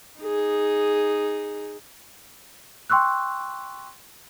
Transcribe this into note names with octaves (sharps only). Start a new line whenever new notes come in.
D#4 G#4
G5 C6 C#6 E6 F#6